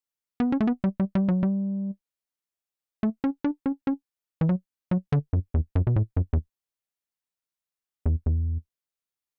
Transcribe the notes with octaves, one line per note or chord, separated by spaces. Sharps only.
B3
C#4
A3
B3
G3
G3
G3
F#3
G3
A3
C#4
D4
C#4
C#4
E3
F#3
F#3
D3
F#2
E2
F#2
B2
A2
F#2
E2
E2
E2